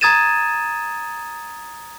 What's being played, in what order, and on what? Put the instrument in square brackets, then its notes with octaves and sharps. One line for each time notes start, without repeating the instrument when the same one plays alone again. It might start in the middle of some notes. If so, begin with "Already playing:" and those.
[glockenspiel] A#5 D#6 G#6 A6 D#7 E7